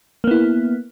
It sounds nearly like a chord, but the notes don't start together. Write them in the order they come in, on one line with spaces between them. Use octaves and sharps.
A#3 B3 E4